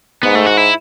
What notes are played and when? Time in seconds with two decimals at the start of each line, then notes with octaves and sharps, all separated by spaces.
0.23 G#2 B3
0.35 A3
0.47 F#4
0.57 E4